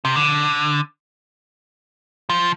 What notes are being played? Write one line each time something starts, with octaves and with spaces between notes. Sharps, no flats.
C3
D3
F3